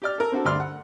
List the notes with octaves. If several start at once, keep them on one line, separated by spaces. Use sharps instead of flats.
G4 D5 F6
A4 A#4
C4 D4 F#4 A4
D2 G2 D5 C6 F6
F#5